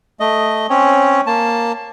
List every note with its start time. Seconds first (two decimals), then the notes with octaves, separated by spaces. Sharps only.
0.20 A3 D#5
0.70 C4 C#4 C#5
1.27 A#3 A5